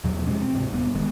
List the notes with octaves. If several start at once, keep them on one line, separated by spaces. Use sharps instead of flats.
E2 B2 F#3
B2 F3 G#3 C#4
C4
D2 G#2 C3
D#1 G3 B3
G1 D#3 G#3 B3